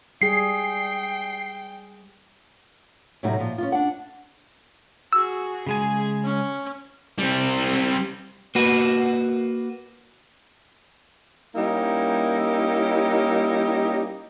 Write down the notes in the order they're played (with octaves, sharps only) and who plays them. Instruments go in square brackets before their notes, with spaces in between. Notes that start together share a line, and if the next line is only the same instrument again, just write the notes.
[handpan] G3 G#4 [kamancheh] G5 [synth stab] C7
[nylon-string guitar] A2 C3 F#3 G3 D#4 F#4
A#2 F3
C#4 D4 F4
D4 F#5
[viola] F#4 G#4 [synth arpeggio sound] E6
[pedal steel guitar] C#3 G#3 G#5 [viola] G#4
[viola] C#4
[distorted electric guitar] G3 C4
[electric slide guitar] A#3 F#4 B4
[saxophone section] G3 A#3 C#4 D#4 E4 G4